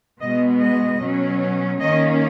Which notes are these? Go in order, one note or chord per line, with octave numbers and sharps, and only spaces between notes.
B2 G#3 B3 D#5
D#5
B2 F#3 C#4
D#3 A#3 C#4 D#5